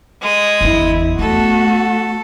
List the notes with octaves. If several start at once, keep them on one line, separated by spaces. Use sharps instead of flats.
G#3 D#6
G1 E2 E4
A3 B3 F#4 A4